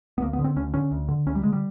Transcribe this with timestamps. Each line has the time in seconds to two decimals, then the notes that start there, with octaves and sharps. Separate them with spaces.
0.18 B3
0.21 D2 A#3
0.33 B3
0.39 D3
0.44 C4
0.56 D2 C#4
0.74 D3 C#4
0.91 D2
1.08 D3
1.27 D2 C#4
1.35 G3
1.43 D3 G#3
1.53 G3